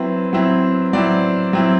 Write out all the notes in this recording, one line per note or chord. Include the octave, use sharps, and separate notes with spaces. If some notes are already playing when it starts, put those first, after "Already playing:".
Already playing: F#3 C4 E4 B4
F#3 C4 E4
F#3 C4 E4 D5
F#3 C4 E4